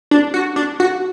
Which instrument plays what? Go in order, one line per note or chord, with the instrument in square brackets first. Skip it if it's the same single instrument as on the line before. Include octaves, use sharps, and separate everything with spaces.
[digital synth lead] D4
F#4
D4
F#4